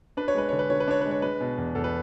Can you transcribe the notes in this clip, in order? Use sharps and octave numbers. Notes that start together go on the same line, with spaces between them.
D4 B4
C#5
G#3 B4
D3 C#5
B4
D3 C#5
B4
D4 C#5
G#3 B4
C#5
G#3 B4
B2
E2
E2 A4
B4